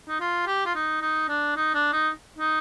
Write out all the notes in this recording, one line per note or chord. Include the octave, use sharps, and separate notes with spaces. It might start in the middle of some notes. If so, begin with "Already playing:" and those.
D#4
F4
G4
F4
D#4
D#4
D4
D#4
D4
D#4
D#4